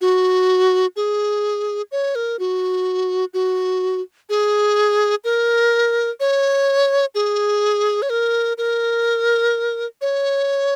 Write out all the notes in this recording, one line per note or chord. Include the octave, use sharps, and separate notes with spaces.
F#4
G#4
C#5
A#4
F#4
F#4
G#4
A#4
C#5
G#4
C#5
A#4
A#4
C#5